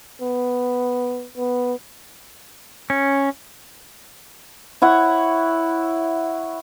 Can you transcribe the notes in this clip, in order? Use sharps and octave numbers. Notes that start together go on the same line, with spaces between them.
B3
B3
C#4
E4 C#5 F#5